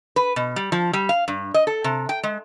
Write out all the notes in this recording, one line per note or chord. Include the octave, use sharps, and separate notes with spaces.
B4
B2
G3
F3
G3
F5
G2
D#5
A4
C3
G5
G#3